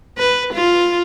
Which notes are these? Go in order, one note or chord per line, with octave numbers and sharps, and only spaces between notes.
B4
F4